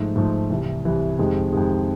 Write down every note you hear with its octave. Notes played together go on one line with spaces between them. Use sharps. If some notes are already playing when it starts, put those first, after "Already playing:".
Already playing: G#2 F3 A3
G#2 F3 A3
C2 C3 E3
C2 C3 E3
F2 C3 D#3 G#3
F2 C3 D#3 G#3